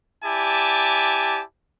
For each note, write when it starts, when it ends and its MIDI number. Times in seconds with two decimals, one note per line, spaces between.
0.24 1.42 64
0.24 1.42 67
0.24 1.42 74
0.24 1.42 80
0.24 1.42 81